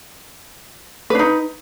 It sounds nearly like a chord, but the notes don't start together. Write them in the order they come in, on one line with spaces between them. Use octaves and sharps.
B4 D4 D#4